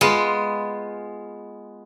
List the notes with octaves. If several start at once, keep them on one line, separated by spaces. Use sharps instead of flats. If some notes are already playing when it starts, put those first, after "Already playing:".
G#3 B3 F4